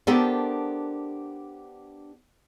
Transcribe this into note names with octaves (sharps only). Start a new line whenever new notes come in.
B3 D4 G4 A4 A#4 C5